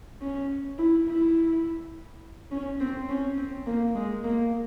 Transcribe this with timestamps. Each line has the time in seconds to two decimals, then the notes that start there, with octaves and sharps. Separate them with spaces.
0.22 C#4
0.78 E4
1.08 E4
2.51 C#4
2.80 C4
3.09 C#4
3.37 C4
3.67 A#3
3.95 G#3
4.24 A#3